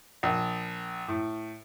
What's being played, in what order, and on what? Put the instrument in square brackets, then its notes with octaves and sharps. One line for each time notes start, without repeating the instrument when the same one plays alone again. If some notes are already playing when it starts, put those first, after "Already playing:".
[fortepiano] A#1
A2